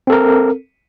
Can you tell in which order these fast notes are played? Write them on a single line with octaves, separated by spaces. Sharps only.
C4 A4 A#4